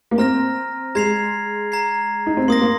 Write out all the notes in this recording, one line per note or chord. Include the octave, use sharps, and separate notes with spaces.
A#3
C4 A#5 F6 A#6
G#3 A#5 G#6 C7 F7
A#5 G#6 C7
D#4
C4
A#3 C6 D#6 A#6
A#3